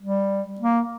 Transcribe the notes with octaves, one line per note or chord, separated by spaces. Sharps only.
G3
A#3